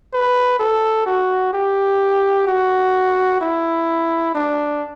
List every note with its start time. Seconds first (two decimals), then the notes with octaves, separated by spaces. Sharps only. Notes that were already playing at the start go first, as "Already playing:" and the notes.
0.13 B4
0.59 A4
1.06 F#4
1.53 G4
2.47 F#4
3.41 E4
4.35 D4